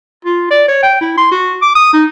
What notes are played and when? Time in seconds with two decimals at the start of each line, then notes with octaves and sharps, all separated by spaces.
0.25 F4
0.51 D5
0.68 C#5
0.83 G5
1.01 E4
1.17 C6
1.31 F#4
1.62 D6
1.75 D#6
1.93 D#4